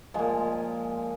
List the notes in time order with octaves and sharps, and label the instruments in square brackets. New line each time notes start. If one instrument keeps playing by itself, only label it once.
[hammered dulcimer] A#2 F3 G#3